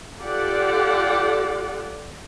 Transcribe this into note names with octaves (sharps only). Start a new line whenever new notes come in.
F4 G4 A4 D5 F#5